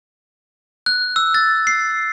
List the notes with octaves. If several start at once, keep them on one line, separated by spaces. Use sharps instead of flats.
F#6
E6
A6
C7